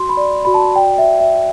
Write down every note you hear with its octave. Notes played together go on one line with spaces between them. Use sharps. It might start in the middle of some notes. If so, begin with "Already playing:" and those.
Already playing: F#4 C6
B5
D5
F#4 B5
A5
D5 G5
E5
F#4
E5
F#4